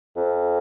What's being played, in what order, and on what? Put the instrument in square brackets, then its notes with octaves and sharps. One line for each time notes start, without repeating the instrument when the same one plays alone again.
[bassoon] F2